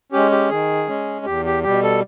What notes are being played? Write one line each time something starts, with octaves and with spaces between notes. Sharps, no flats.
G#3 C#4 G4
G4
D#3 G#4
G#3 C#4
E2 G4
G4
B2 G3 G4
A4